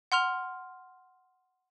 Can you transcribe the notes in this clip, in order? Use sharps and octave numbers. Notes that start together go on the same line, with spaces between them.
F#5 C6 F6 F7